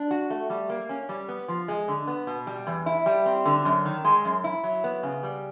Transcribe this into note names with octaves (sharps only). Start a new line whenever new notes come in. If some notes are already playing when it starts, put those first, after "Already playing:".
Already playing: D4
F#4
A3
G3
A#3
C#4
G3
B3
F3
G#3
D3
B3
B2
G3
E2
E4
G3
C4
D3
F#2
D#3
G#3
F#2
E4
F#3
B3
C#3
G3